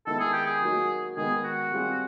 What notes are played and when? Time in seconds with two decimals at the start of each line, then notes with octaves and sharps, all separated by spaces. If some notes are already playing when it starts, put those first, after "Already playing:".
0.06 D#3 G#3 B3 E4 A4
0.20 G#4
0.33 G4
0.47 G#4
0.62 F#3 A#3 D#4 F#4
1.17 D#3 G#3 B3 G#4
1.44 F#4
1.72 G3 C4 F4 G#4